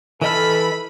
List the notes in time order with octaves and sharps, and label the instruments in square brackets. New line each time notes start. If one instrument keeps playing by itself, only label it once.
[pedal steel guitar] E3 D#5 F6 [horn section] A4 [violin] B5